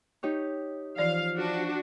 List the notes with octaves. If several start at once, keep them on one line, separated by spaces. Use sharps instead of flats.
D#4 G4 C#5
E3 F3 D5 F5
D4 F#4